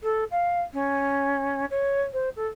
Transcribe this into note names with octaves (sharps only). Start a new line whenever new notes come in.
A4
F5
C#4
C#5
C5
A4